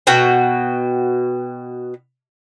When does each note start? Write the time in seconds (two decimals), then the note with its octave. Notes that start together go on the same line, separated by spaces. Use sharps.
0.07 B2 F#4 G5